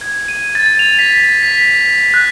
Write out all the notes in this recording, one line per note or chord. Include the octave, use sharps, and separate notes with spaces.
G#6
D#7
A6
F7
B6
B6
F#6